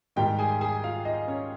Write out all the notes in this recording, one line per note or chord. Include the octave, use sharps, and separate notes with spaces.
G#2 D#3 G3 G4 G5
G#4 G#5
G#4 G#5
F4 F5
D#4 D#5
C#4 C#5